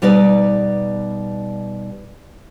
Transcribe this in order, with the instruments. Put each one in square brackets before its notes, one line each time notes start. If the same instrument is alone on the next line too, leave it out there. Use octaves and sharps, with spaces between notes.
[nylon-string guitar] B2 G3 D#4 B4 D5